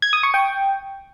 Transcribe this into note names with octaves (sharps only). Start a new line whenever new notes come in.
G#6
D#6
C#6
G5